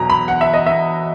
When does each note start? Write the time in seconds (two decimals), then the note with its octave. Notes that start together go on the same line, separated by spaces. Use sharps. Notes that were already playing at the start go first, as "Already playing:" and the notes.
Already playing: E2 B2 F#3 A#5
0.10 B5
0.28 F#5
0.41 E5
0.54 D#5
0.66 E5